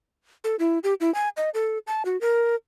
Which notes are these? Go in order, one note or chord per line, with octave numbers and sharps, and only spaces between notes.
A4
E4
G4
E4
G#5
D#5
A4
A5
F#4
A#4